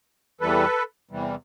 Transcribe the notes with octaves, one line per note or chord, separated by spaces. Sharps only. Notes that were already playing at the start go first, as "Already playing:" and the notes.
E2 C3 E3 G3 A4 B4
E2 C3 E3 G3